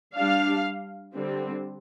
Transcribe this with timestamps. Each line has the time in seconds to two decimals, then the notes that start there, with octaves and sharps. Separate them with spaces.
0.16 G3 D4 F5
1.15 D3 G3 C4